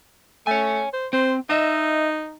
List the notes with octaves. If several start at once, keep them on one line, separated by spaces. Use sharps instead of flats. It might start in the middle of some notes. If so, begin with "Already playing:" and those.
A3 C#5 G#5
C5
C4 C5
D#4 D#5 E5